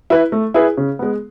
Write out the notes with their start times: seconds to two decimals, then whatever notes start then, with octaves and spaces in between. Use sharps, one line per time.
0.10 E4 B4
0.32 A3
0.54 E4 G#4 B4
0.77 C#3
0.99 G#3 B3